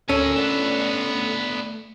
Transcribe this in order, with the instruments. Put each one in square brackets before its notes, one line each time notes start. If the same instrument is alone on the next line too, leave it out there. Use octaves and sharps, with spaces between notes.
[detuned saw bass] D2 [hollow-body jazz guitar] C#4 [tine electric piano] A4 [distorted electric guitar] A#4 G#5
[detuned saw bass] A3 [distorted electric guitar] B3 D4